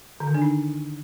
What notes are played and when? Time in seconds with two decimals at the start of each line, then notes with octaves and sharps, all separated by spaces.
0.20 D3
0.27 D#3
0.35 D4
0.42 D#4